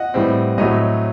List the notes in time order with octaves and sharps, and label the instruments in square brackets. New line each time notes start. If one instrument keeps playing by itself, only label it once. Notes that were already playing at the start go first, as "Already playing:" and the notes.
Already playing: [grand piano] D#5 F#5
A2 E3 G3 C4
A2 F#3 A3 C4 D#5